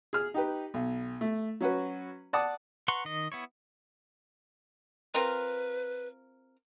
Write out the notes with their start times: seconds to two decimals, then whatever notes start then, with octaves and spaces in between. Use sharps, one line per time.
0.13 G#4 F6
0.34 D#4 G4 B4
0.74 B1
1.21 A3
1.60 F#3 C#4 F#4 B4
2.33 D5 F#5 A5 D6 D#6
2.88 B4 F#5 A#5 C6 C#6
3.05 D#3 D#5
3.32 B3 E4 C#5
5.14 C4 F4 A#4 B4